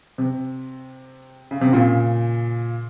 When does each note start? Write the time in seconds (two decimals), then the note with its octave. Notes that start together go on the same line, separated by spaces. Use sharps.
0.18 C3
1.51 C#3
1.61 C3
1.72 A#2 C#3